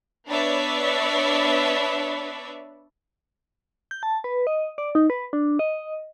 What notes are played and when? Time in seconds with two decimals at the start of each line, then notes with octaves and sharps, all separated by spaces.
0.26 B3 D4 B4 C#5 D5 E5
3.91 G6
4.03 A5
4.24 B4
4.47 D#5
4.78 D5
4.95 D#4
5.10 B4
5.33 D4
5.59 D#5